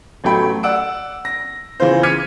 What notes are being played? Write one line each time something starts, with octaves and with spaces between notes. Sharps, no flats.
A1 F#3 A3 G5 B5
D5 F#5 E6 D7
A#6
C#3 E3 F4 C5
D6 F6 G#6 B6 C#7 D#7